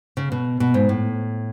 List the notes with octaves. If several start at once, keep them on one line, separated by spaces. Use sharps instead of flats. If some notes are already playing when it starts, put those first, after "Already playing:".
C#3
B2
B2
G#2
A2